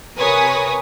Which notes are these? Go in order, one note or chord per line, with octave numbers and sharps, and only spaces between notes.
C3 A#4 B4 C#5 G#5 D#6